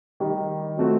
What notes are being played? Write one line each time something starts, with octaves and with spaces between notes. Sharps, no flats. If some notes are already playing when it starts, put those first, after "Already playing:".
D#3 G3 D#4
F#3 A3 C4 F#4